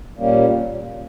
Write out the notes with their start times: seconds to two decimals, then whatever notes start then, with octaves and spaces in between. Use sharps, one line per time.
0.18 A#2 G3 A#3 C#4